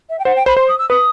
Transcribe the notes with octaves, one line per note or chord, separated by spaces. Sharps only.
E5
G5
C5 F#5
G5
C5 B5
C5 C6
D#6
E6
B4 D#6